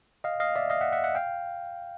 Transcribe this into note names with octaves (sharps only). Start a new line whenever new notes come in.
D#5 F5
D#5 F5
D5 E5
D#5 F5
E5 F#5
E5 F#5
E5 F#5
F5 G5